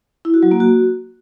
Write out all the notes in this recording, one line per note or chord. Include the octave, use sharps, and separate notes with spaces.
E4
F#4
F#3
A#3
F#4